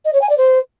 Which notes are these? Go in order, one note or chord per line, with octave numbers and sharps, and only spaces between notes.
D#5
C#5
G#5
D5
C5